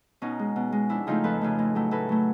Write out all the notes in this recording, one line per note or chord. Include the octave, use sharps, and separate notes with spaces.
B2 C#4 D#4
G#3
B2
G#3
F2 D4 E4
C#3 F3 A3 D#4 F4
F2 A4 B4
C#3 F3 A3
A2
F#3 A3
A2 A4 B4
F#3 A3